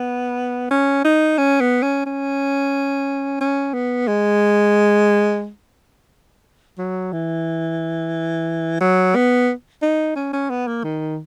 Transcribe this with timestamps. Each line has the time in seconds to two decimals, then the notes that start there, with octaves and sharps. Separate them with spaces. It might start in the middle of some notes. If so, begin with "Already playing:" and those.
Already playing: B3
0.71 C#4
1.05 D#4
1.38 C#4
1.61 B3
1.83 C#4
2.06 C#4
3.41 C#4
3.74 B3
4.08 G#3
6.78 F#3
7.13 E3
8.81 F#3
9.16 B3
9.83 D#4
10.16 C#4
10.33 C#4
10.50 B3
10.68 A#3
10.84 D#3